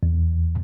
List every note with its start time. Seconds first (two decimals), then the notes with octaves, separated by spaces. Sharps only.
0.03 E2